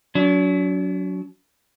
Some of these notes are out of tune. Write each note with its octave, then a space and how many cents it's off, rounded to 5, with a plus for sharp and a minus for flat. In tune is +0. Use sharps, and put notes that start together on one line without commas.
F#3 +0 D4 -45